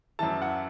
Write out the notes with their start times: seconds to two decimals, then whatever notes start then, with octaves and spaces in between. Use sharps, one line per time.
0.19 F#2 E3 A5
0.42 F#5